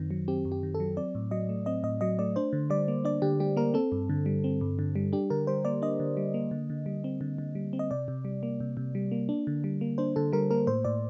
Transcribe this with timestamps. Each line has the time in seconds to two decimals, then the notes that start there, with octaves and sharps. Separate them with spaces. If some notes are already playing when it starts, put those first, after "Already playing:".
Already playing: F#2 D#3 C4
0.11 F#3
0.28 C4 G4
0.45 F#2
0.52 G4
0.63 D#3
0.75 A4
0.80 F#3
0.97 C4 D5
1.15 A2
1.31 F#3 D#5
1.49 A3
1.66 C4 D#5
1.83 A2 D#5
2.01 F#3 D#5
2.19 A3 D5
2.36 D4 C5
2.53 D3
2.70 G3 D5
2.88 A#3
3.05 D4 D5
3.22 D3 G4
3.40 G3 G4
3.57 A#3 A#4
3.74 C4 A4
3.92 G2
4.09 D3
4.26 G3
4.44 C4
4.61 G2
4.79 D3
4.95 G3
5.13 D4 G4
5.30 D3 A#4
5.47 G3 C5
5.65 A#3 D5
5.82 D4 D#5
6.00 D3
6.17 G3
6.34 A#3
6.51 D3
6.70 D3
6.86 G3
7.04 C4
7.21 D3
7.38 D3
7.55 G3
7.73 C4
7.79 D#5
7.91 C3 D5
8.08 C3
8.25 G3
8.43 A#3
8.60 C3
8.77 C3
8.95 G3
9.12 A#3
9.29 D4
9.47 D3
9.64 G3
9.81 A#3
9.98 D4 C5
10.16 D3 A4
10.33 G3 A#4
10.51 A#3 A#4
10.67 A2 C5
10.85 A2 D5